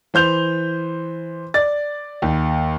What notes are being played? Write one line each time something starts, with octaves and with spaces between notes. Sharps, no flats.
E3 C5 G6 F7
D5 A6
D#2